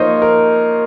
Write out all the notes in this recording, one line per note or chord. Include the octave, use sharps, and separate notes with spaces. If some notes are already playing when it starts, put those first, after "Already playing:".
Already playing: F3 A#3 D#4 C5 C#5 D#5
A#4